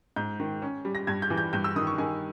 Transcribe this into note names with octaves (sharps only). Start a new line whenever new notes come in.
G#2 G6
D#3
C#4
G3
A#6
G2 G#6
G6
E3
G6
G2 G6
E6
D#3 D#6
C#6
D#3 G#5